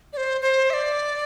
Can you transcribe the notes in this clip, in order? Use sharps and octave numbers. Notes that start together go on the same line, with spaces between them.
D5
C5
C5
E5
D5